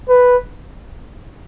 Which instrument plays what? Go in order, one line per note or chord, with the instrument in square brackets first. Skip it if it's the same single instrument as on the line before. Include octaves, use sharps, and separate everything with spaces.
[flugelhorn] B4